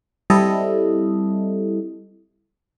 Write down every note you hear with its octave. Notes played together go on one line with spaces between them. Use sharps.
G3 C4 E4 A4 D#5